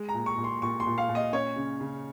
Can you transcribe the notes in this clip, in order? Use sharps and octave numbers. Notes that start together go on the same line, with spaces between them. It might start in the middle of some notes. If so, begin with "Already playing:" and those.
Already playing: G#3
A#5
A#2
C#6
A#2
C6
A#2 C#6
C6
A#2
F5
A#2
D#5
C#4 C#5
C#3
C#3